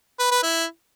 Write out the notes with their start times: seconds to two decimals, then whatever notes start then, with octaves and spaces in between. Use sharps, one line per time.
0.19 B4
0.31 B4
0.43 E4